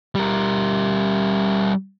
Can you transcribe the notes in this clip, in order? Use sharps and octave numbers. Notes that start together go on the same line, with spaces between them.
G3 A#4